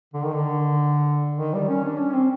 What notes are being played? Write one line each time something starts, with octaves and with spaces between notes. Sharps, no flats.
D3
D#3
D3
D#3
G3
C#4
D4
C#4
C4